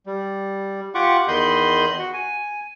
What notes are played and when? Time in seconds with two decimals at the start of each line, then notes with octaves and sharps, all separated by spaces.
0.06 G3
0.95 F4 G4 F#5 C#6 D6
1.28 E2 D#3 D#5 B5 C6 G6
1.99 F#4
2.14 G#5